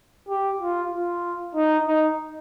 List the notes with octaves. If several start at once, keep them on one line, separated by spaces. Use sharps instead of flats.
G4
F4
F4
D#4
D#4